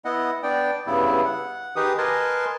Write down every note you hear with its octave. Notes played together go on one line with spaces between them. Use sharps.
B3 E4 D#5 F#5
B3 D4 D5 G5
G2 C#3 B3 E4
F#5
D#3 D#4 G4 G#4 B4 D#6
A#4 B4 D#5 G#5 A5 C6